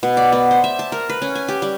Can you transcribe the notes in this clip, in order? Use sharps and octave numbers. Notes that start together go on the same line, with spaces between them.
B2
D5
B3
C5
E5
A5
A#4
B4
C#4
G#5
G4
G3